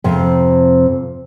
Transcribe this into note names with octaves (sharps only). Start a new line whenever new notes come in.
F2 C3